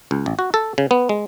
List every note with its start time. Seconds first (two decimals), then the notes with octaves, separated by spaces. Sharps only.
0.11 C#2
0.26 A1
0.39 F#4
0.54 A4
0.78 C#3
0.91 B3
1.09 G#3